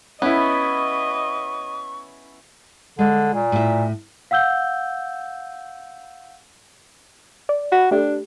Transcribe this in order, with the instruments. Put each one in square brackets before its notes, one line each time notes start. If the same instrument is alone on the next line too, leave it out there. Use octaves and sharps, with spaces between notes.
[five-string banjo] B3 [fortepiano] C#4 E4 [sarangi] D#5 [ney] C#6
[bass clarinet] D3 [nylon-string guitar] G#3
[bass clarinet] A#2
[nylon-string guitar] A2 E5
[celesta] F5 F#5 E6 G6 G7
[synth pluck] D5
[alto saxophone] F#4 [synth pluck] B5
[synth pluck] A3 G4 [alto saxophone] D4